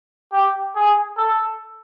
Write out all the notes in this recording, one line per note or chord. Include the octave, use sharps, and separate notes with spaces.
G4
G#4
A4